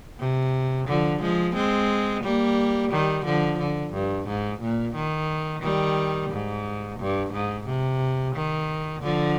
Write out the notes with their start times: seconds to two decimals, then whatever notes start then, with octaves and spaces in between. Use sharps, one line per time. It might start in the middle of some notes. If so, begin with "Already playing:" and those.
0.19 C3
0.88 D3 F3
1.22 F3 G#3
1.55 G#3 C4
2.24 G3 A#3
2.92 D#3 G3
3.25 D3 F3
3.60 D3
3.93 G2
4.27 G#2
4.61 A#2
4.95 D#3
5.63 D#3 G3
6.31 G#2
7.00 G2
7.33 G#2
7.67 C3
8.35 D#3
9.02 D3 F3